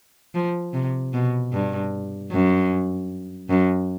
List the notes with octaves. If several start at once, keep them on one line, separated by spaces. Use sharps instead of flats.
F3
C3
B2
G2
F#2
F#2